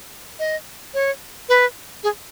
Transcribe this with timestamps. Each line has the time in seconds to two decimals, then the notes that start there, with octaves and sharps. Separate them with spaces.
0.39 D#5
0.94 C#5
1.49 B4
2.04 G#4